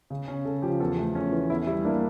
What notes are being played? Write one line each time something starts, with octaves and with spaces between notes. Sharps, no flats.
C#3
C#4
C#3 A4
F3 G4
E2 A4
A3
C#4
E3
E2 E4
G3 E4
A#3 D4